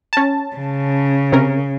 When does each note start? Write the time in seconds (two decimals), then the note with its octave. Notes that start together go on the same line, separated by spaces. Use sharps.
0.13 C#4 A5
0.56 C#3
1.32 C3 C#4 A#4